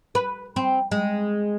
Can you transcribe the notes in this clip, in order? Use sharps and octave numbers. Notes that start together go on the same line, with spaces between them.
B4
C4
G#3